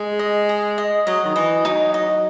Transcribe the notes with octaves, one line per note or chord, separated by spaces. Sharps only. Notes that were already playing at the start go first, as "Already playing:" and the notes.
Already playing: G#3 G#4
D#5
G#4
D#5
F#3 D#5
D#3
E3 D#5
F#3 D#4
D#5